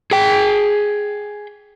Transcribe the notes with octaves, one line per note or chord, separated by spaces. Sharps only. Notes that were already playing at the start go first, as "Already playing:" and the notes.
G#4 G5